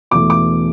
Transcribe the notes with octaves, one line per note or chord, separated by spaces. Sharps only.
E1 E2 E3 A3 D6
D6